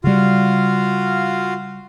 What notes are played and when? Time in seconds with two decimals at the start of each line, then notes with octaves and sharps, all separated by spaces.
0.04 C#3 G3 F4 F#4 F5